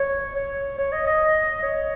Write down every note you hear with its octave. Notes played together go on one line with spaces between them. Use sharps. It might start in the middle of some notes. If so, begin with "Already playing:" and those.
Already playing: C#5
C#5
C#5
D#5
D#5
C#5